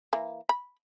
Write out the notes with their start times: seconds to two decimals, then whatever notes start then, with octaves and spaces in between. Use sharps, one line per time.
0.13 E3 A#3
0.49 B5